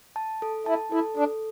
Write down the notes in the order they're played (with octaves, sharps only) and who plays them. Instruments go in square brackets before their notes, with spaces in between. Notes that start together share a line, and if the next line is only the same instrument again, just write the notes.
[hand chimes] A5
A4
[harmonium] E4 [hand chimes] A5
[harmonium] E4 [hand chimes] A4
[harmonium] D4 [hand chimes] A4